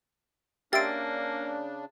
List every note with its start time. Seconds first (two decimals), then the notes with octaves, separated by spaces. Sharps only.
0.73 C#3 A#3 D4 G4 E5 C6 A6 D7